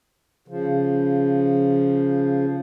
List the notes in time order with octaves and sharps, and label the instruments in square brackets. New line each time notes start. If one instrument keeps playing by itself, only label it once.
[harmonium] C#3 F3